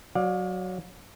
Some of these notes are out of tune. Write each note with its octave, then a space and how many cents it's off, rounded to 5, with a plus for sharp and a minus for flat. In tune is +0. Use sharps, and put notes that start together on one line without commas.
F#3 +0 D5 +15 F5 +40